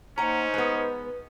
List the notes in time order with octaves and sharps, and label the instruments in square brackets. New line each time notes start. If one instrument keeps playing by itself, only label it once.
[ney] A#3 [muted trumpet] C#4 [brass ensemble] D#4 C5 [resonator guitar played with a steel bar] F#5 A#5
[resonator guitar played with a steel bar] G#3 B3 [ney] B4